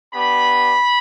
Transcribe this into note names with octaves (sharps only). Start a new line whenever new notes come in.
B3 D4 G4 B5